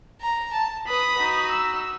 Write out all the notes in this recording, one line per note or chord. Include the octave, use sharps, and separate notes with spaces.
A#5
A5
B4 B5 D#6
D#4 F#4
E6